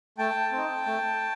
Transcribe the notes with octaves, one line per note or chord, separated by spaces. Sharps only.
A3 G5 A5
C4 D#4
A3